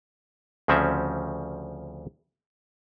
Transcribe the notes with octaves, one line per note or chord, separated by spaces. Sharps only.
D2 C#3 F3 C4 C#4 E5